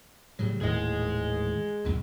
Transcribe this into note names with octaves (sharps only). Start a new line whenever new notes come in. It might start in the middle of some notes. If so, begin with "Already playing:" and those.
A2 C#3 F#3 G3
D#1 A2 D#3 E3 G#4 D#5
E1 C#2 F#2 A#2